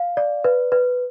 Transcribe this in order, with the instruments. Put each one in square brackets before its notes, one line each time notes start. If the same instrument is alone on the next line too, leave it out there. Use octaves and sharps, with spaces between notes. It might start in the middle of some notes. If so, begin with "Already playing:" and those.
Already playing: [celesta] F5
D5
B4
B4